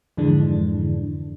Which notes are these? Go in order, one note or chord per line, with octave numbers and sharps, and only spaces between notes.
F2 G#2 D3 E3 G#3 D4